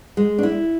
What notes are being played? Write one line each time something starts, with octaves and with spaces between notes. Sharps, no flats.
G#3
D4
E4